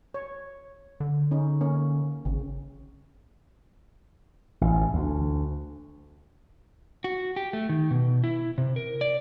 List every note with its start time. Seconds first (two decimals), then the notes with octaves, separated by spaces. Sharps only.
0.14 C#5
1.00 D3
1.31 C#4 D#4
1.61 A#3 C#4 A#4
2.25 G#1 C#3
4.61 A1
4.94 D2
7.04 F#4
7.36 G4
7.53 A3
7.69 D#3
7.91 B2
8.24 E4
8.58 C3
8.76 A#4
9.01 D5